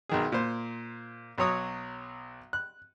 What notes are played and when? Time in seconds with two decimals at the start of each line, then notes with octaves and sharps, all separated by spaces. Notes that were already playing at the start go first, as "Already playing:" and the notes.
0.09 B1 D#3 G#4
0.32 A#2 C5
1.38 B1 F#3 C#5 D#6
2.53 F#6